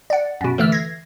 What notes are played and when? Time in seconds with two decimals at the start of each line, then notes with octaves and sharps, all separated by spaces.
0.10 D5 F#5
0.41 F#2 B2
0.58 D3 E3 A3 E6 F6
0.72 G#6 A#6 C7